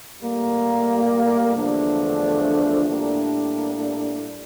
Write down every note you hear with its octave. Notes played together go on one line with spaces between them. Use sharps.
A2 G3 A#3
E2 D3 F3 A3 D4
A2 G3 A#3 D4